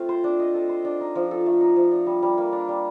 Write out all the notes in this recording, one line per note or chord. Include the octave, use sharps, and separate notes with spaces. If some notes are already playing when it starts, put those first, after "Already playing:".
Already playing: A3 C4 F4
C5
D4
D#5
A4
C5
D4
D#4
F3
A4
A3
D#4
F3
D4
G3
G3
A#3
D4
G3